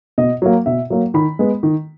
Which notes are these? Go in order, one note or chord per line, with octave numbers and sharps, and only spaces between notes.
B2 D#5
F#3 A#3
B2 E5
F#3 A#3
D#3 B5
G#3 B3
D#3